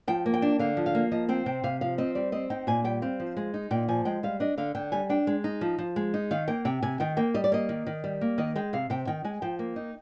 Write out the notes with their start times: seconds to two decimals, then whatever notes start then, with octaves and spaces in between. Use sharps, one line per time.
0.08 F3 G5
0.26 A#3
0.34 G5
0.42 D4
0.59 D3 F5
0.77 F3
0.86 F5
0.95 A#3
1.12 F3 D#5
1.29 C4 G5
1.46 C3 G5
1.64 C3 F5
1.81 F3 F5
1.98 C4 D#5
2.15 G3 D5
2.32 C4 D#5
2.50 D#4 G5
2.67 A#2 G#5
2.84 G3 G5
3.02 C4 F5
3.20 F3
3.37 G#3
3.54 D#4
3.71 A#2 G5
3.88 F3 G#5
4.05 G#3 G5
4.23 G3 F5
4.40 D4 D#5
4.58 D3 F5
4.75 D3 G5
4.92 G3 G#5
5.09 D4 G5
5.27 G#3
5.44 D#4
5.61 F3
5.78 F3
5.96 G#3
6.14 D#4
6.31 D#3 F5
6.48 A#3 G5
6.65 C3 G5
6.83 C3 G#5
7.00 D#3 G5
7.17 A#3 G5
7.34 G3 D#5
7.44 D5
7.52 A#3 D#5
7.69 D#3
7.87 D#3
8.04 G3
8.21 A#3
8.38 D#3 D#5
8.56 G#3 G5
8.73 C3 F5
8.90 C3 G5
9.07 D#3 G5
9.24 G#3 G#5
9.42 F3 G5
9.59 A#3
9.76 D#4